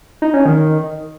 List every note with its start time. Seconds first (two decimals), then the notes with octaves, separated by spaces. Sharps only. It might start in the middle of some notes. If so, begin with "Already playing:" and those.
0.22 D#4
0.34 C#4
0.45 D#3